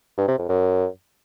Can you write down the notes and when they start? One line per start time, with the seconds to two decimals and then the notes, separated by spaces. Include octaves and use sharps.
0.18 G2
0.28 C3
0.39 F2
0.49 F#2